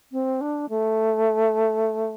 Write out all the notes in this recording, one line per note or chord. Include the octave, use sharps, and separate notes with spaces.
C4
D4
A3